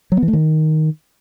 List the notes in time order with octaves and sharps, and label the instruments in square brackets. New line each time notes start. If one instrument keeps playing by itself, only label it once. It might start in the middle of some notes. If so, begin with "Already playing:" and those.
[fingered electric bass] F#3
B3
E3
A3
D#3